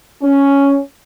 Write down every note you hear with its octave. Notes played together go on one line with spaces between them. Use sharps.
C#4